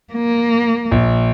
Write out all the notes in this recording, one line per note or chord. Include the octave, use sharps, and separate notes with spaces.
A#3
A#1